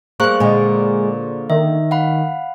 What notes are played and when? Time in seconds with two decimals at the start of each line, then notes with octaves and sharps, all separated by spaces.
0.20 G3 A#3 G#4 C5 C#6 F#6
0.40 A#2 D3 G#3
1.50 D#3 E5
1.91 F5 F#5 B5